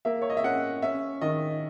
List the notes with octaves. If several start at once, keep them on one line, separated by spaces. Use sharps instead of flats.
A#3 E5
C#5
D#5
E5
C#4 F#5
C#4 E5
D#3 D#5